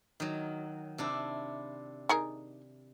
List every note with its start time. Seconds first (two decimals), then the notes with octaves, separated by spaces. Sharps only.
0.20 D#3 F#3
0.98 C3 D4 E4
2.09 D#4 G#4 A#4